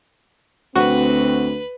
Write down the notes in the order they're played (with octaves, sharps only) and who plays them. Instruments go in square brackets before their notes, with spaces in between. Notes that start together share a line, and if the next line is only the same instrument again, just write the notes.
[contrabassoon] D2 [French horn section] C4 [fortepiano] F#4 [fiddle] B4